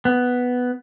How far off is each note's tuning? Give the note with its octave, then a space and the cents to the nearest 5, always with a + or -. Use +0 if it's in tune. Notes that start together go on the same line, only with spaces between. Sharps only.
B3 +5